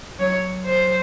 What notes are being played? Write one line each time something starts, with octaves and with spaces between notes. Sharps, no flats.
F#3 C#5
C5